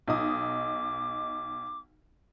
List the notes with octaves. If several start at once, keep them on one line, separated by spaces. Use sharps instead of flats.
B1 D#4 D6 D#6